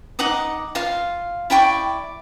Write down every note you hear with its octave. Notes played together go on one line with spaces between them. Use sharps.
D#4 F#5 D6 D#6
F4 F5
E4 D5 G5 C#6